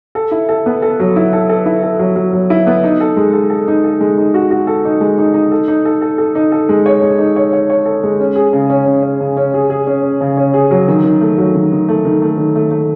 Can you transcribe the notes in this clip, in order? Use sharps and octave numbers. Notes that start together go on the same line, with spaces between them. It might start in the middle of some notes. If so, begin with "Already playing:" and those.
A4
E4
A4
B3
A4
F#3
E4
A4
A4
E4
A4
F#3
F#3
F#3
E4
B3
D#4
A4
G#3
A4
A4
D#4
A4
G#3
D#4
F#4
F#4
A4
D#4
G#3
D#4
D#4
A4
D#4
A4
A4
A4
D#4
A4
G#3
C#5
G#3
D#4
C#5
C#5
C#5
A4
G#3
C#4
G#4
C#3
C#4
C#3
C#4
C#3
C#4
G#4
G#4
C#4
C#4
C#3
C#4
G#4
F#3
D#3
D#3
A3
F#3
D#3
D#3
A3
D#3
A3
D#3
A3
A3